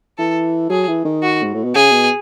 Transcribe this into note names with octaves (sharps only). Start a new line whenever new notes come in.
E3 A4
F#3 G#4
E3
D#3
F#4
G#2
A2
B2
C#3 G#4
B2